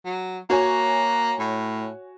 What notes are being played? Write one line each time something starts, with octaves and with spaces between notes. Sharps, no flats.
F#3
A#3 F#4 C#5 G#5
A2